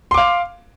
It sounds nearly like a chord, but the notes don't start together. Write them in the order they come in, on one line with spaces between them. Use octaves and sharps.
C6 D6 F5